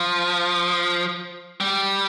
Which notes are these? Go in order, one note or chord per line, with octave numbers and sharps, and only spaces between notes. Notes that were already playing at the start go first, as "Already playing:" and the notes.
Already playing: F3
G3